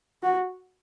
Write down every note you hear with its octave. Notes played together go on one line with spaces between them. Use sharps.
F#4